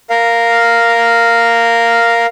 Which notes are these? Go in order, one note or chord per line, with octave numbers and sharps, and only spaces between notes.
A#4 F5